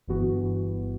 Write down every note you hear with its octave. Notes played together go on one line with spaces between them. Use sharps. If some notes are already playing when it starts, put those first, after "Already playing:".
G1 G2 E3 B3 F#4